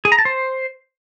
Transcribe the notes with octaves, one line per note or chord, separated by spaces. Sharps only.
G#4
A#5
A5
C5